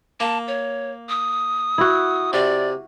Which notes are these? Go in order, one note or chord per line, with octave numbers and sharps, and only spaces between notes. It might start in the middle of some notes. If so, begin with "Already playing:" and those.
A#3 A5
C#5
D#6
E4 F#4
C3 D5